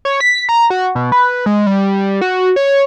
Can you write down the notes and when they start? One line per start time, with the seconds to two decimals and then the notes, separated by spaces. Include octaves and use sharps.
0.05 C#5
0.20 B6
0.49 A#5
0.70 F#4
0.95 B2
1.12 B4
1.46 G#3
1.66 G3
2.21 F#4
2.56 C#5